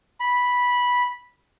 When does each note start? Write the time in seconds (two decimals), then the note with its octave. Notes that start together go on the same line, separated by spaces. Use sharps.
0.20 B5